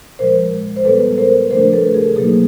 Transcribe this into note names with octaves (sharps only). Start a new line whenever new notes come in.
A#2 F3 G#3 A#4 C5
C5
A#2 G3 B3 A4 B4
A#4 C5
C#3 F3 A3 D4 A#4 C5
A4 B4
G#4 A#4
B2 F#3 A#3 D#4 G#4